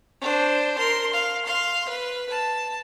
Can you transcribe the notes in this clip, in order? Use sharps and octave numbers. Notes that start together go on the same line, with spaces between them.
D4 C5
A#4 C6
F5
F5 C6
B4
A5